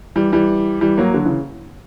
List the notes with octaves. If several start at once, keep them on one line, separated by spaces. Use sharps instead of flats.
E3 G3
E3 G3
E3 G3
F#3 A#3
D3 F#3
C#3 E3